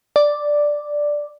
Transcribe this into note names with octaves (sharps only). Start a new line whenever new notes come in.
D5